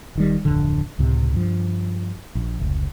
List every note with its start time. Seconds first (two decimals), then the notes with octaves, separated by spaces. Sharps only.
0.15 E1 D#3 G3
0.45 D1 F2 D3
0.99 C#2 A2 C3
1.34 G2 F3
2.35 A#1
2.60 F1 C#2